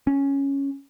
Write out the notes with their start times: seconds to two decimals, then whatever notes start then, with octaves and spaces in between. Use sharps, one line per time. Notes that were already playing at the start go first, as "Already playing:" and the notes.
0.07 C#4